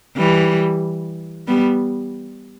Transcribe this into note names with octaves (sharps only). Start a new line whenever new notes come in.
E3 G3
G3 B3